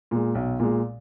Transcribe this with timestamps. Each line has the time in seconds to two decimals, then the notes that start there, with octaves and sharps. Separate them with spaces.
0.11 A#2 G#3
0.35 B1
0.60 A#2 G#3